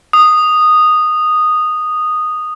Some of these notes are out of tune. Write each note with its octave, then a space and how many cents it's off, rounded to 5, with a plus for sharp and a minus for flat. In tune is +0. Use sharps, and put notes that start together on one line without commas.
D#6 -10